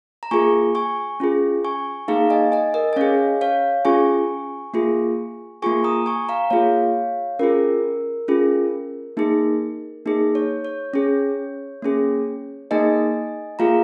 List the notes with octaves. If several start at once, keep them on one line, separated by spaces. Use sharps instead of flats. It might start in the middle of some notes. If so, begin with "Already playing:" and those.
A#5
A#3 F4 G#4 G#5 C#6
G#5 C#6
C#4 F4 G#4
G#5 C#6
A#3 D#4 G#4 F5 A#5
D#5 G#5
D#5 G#5
A#4 D#5
G#5
C#4 G#4 C#5 F5
C#5 F5
C#4 F4 G#4 G#5 C#6
A#3 F4 G#4
A#3 F4 G#4 G#5 C#6
A#5 D#6
G#5 C#6
F5 A#5
A#3 F4 G#4 C#5 F5
C#4 F4 G#4 A#4
C#4 F4 G#4
A#3 D#4 G#4
A#3 D#4 G#4
C#5
C#5
C#4 G#4 C#5
A#3 C#4 G#4
A#3 D#4 G#4 D#5 G#5
A#3 F4 G#4 F5 A#5